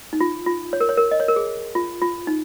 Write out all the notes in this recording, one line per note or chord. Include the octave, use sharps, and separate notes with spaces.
D#4
F4
F4
C#5
A#4
C#5
A#4
D#5
C#5
A#4
G#4
F4
F4
D#4